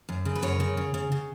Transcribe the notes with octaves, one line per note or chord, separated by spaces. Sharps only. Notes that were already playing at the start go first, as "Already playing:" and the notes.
F#2
C#3
B4
F#2 A#4 C#5
C#3
C#3
C#3
C#3